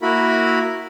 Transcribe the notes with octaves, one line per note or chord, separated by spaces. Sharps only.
A#3 E4 F#4 A#4 B5